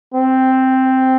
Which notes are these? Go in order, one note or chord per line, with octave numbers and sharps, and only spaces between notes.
C4